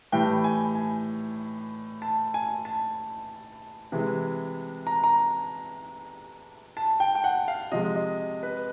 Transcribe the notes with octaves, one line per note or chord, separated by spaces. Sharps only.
A2 E3 G3 G5
G#5
G#5
A5
G#5
A5
C3 E3 G#3
A#5
A#5
A5
G5
G5
F#5
F5
C3 F3 G#3 D#5
D#5
B4